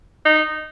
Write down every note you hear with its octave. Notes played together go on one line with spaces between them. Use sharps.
D#4